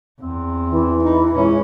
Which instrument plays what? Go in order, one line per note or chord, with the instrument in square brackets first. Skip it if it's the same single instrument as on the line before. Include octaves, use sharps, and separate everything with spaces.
[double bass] E2 [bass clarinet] C4
[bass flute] E3
[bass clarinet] D#4
[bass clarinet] A#2 [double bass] G#3 C#4